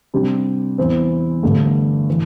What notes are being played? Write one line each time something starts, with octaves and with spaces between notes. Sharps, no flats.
C3 G3 D4 G4
E2 E3 C4
G1 G2 D3 A3
E3